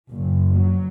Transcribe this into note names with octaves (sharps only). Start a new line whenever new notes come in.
F#1
F#3